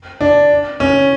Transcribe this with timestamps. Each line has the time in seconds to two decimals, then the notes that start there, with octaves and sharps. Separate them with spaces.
0.21 D4
0.80 C#4